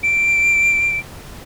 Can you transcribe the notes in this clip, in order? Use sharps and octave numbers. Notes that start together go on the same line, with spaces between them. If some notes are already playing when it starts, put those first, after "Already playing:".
D7